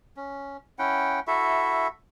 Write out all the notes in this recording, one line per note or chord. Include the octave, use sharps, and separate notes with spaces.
C#4
C#4 E4 F#5 G5
E4 F#4 A4 E5